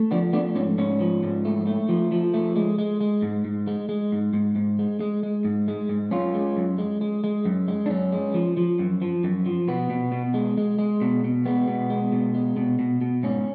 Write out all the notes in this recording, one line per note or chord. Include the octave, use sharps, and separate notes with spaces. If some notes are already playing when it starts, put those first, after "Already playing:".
Already playing: A3
F3 B3 D4
A3 B3 D4
G#2 C#4
G#2 C#4
F3
G#2
A3
A3
F3
F3
A3
G#3
G#3
G#3
G#2
G#2
G#3
G#3
G#2
G#2
G#2
G#3
G#3
G#3
G#2
G#3
G#2
F#2 C#4 F4
G#3
F#2
G#3
G#3
G#3
F#2
G#3
D4
F#2 C#4
G#3
F3
F3
F#2
F3
F#2
F3
B2 B3
B2
B2
G#3
G#3
G#3
B2
B2
G#3 B3
B2
G#3
B2
G#3
B2
B2
B2
G#2 C#4